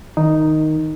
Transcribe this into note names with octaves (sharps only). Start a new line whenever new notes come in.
D#3 D#4